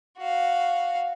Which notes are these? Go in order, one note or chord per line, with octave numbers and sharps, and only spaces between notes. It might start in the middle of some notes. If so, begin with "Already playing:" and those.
F#4 F5